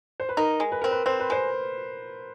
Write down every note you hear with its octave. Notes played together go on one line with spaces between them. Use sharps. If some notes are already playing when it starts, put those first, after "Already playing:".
C5
B4
D#4 A#4
G#3
B4
C4 A#4
B4
C4 C5
B4
G#3 C5